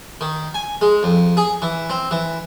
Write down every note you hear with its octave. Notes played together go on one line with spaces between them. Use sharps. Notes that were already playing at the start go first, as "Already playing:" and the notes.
D#3
G#5
G#3
F2
G#4
E3
C4
E3